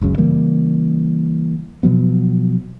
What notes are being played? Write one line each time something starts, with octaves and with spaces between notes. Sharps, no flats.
F#1 C#2 F#2 C#3
C#3 E3 G3 A#3
B2 F3 F#3 B3